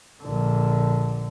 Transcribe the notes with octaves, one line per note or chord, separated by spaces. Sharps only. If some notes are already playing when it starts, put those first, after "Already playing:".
A#1 D3